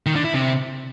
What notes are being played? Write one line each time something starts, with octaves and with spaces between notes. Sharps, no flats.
D#3
D3
E4
C3